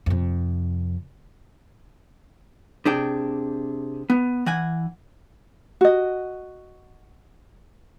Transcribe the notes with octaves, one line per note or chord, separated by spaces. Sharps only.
F2 C3
C3 D4 G#4 G5
B3
E3 F#5 G#5
F#4 D#5